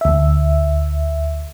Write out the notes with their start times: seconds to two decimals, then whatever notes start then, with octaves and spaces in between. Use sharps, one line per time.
0.01 D2 E5